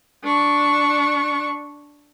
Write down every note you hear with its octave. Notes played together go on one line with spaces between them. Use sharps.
D4 C#6